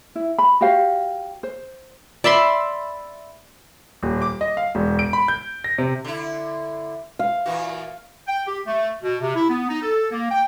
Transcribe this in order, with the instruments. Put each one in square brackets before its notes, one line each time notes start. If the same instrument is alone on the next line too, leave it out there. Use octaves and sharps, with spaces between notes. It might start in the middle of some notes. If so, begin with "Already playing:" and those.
[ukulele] E4
B5
F#4 G4 C5 F5
C5
[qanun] D5 E5 B5 C6
[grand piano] D#1
D6
D#5
F5
E1
D7
B5
G6
A#6
C3
[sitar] D3 E4
[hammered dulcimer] F5
[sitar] A#2 E3 F#4
[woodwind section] G5
G4
A3
B2
C3
E4
B3
D#4
A4
A#3
G5